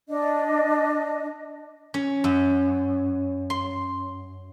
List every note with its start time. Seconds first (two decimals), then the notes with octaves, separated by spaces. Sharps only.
0.09 D4 D#5
1.94 C#4
2.24 F#2
3.50 C6